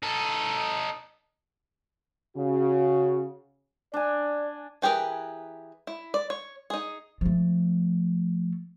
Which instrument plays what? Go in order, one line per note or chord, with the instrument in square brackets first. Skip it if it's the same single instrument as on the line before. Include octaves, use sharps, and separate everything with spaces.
[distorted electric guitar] D#4 A4
[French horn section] C#3 F#4
[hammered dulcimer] D4 G#5 [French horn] D5
[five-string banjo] E3 G4 G#4 A#4 B4
E4
D5
C#5
D#4 G#4
[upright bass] F3 A3